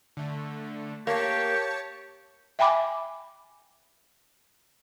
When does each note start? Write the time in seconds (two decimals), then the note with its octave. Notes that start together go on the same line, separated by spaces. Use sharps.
0.17 D3 A3
1.07 A#3 G4 C#5 A5 C#6
2.59 E5 G5 G#5 B5 D6